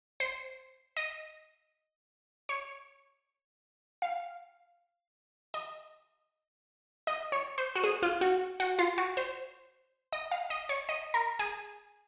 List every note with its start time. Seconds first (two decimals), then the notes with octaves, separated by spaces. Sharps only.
0.20 C5
0.97 D#5
2.49 C#5
4.02 F5
5.54 D#5
7.07 D#5
7.32 C#5
7.58 C5
7.75 F#4
7.84 G#4
8.03 F4
8.21 F#4
8.60 F#4
8.79 F4
8.98 F#4
9.17 C5
10.12 D#5
10.31 F5
10.50 D#5
10.69 C#5
10.89 D#5
11.14 A#4
11.39 G#4